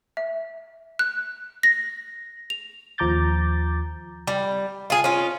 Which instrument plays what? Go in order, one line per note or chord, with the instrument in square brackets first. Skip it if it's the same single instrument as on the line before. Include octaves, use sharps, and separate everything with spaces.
[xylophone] E5
F#6
A#6
F7
[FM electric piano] D#2 F3 A#5 D6 G6 A6
[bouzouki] G3
F4 G#4
C#4 F4